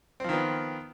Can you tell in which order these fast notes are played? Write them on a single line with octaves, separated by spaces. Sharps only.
C4 F3 D#3 B3